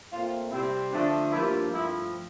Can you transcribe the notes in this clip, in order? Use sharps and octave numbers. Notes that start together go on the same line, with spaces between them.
A#2 A3 C4 F4
C3 G3 C4 E4
D3 F3 A3 D4
G2 F3 A#3 E4
G2 F3 A3 C4 E4